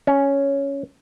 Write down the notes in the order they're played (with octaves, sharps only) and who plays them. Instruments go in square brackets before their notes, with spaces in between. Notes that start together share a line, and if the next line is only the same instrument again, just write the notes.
[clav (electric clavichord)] C#4